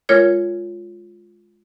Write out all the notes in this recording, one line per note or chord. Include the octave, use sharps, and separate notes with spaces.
G#3 F4 A#4 C#5 G#6